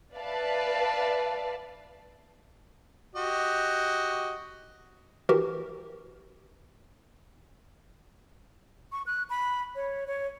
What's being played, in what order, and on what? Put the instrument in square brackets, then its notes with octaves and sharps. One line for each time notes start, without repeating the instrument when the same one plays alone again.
[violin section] B4 D5 E5 F5 A5
[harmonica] F#4 G4 D#5
[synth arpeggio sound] E3 F#4 G4 A#4
[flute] C#6
F#6
B5
C#5
C#5